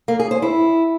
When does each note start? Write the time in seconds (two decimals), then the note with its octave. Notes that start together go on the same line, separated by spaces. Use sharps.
0.08 A#3
0.19 G#4
0.31 C5
0.42 E4